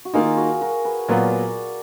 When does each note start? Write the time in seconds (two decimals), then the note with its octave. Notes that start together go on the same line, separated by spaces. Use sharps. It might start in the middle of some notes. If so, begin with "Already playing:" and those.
0.05 F#4
0.13 D#3 A#3 D#4 F4 G#4
0.37 F#4 A#4
0.61 F#4 A#4
0.85 G#4 B4
1.08 A#2 F#3 B3 F4 A#4 D5